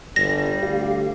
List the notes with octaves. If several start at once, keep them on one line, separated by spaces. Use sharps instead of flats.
G1 G3 A#6
D2 G4 F5